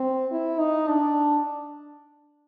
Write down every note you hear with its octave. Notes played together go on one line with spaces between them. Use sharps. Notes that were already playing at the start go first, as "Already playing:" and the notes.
Already playing: C4
E4
D#4
D4